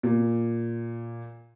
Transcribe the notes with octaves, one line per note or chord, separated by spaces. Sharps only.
A#2